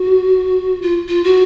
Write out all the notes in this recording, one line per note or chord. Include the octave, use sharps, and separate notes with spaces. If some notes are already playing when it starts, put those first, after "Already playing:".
Already playing: F#4
F4
F4
F#4